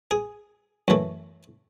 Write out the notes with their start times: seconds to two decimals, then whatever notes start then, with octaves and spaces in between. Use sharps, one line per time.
0.11 G#4
0.88 F#2 E3 A3